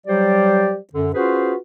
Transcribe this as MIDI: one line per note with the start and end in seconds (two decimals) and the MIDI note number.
0.07 0.76 54
0.07 0.76 55
0.07 0.76 67
0.07 0.76 72
0.07 0.76 74
0.94 1.09 42
0.94 1.09 50
1.14 1.54 61
1.14 1.54 65
1.14 1.54 66
1.14 1.54 68
1.14 1.54 71
1.14 1.54 72